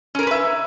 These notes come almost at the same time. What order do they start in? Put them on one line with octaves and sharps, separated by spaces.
C#4 A#4 C#5 B4 E5